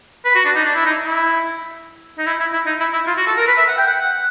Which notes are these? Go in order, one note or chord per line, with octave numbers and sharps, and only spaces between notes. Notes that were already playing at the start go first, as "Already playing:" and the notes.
B4
F#4
D4
D#4
D4
E4
D#4
E4
D#4
E4
E4
E4
D#4
E4
E4
F4
F#4
A4
A#4
B4
E5
F#5
G5
F#5